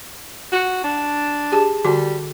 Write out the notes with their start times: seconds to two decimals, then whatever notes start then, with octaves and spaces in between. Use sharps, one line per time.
0.52 F#4
0.84 D4
1.52 G4 G#4 A5
1.85 D3 G3 F#4 D6